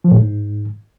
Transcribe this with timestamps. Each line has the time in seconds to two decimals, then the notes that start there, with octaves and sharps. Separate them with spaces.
0.04 F3
0.11 A2
0.18 G#2